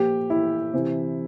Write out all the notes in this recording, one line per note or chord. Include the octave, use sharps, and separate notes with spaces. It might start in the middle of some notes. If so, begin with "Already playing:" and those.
Already playing: A#2 F3 G4
E4
C3 E3